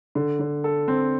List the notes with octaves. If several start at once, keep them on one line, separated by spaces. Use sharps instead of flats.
D3
D3
A4
C4